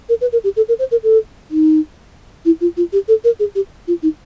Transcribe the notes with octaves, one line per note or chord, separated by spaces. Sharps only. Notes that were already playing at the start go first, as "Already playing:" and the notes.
A#4
B4
A#4
G4
A4
A#4
C5
A#4
A4
D#4
E4
F4
F4
G4
A4
A#4
G#4
G4
F4
D#4